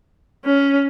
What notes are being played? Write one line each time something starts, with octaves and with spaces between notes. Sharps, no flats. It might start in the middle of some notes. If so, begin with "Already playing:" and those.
C#4